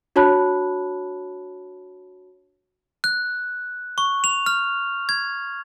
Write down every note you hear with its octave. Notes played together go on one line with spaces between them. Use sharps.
D4 F#4 C#5 A5 B5 F#6
F#6
C#6
F7
F6
G#6